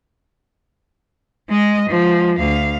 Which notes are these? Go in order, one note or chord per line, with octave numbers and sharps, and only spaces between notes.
G#3 D#5
F3 G#3
D2 F5